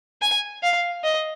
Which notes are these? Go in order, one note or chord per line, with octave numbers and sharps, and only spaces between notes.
G#5
F5
D#5